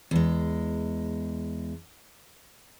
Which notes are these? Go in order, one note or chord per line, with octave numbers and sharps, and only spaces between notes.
E2 G#3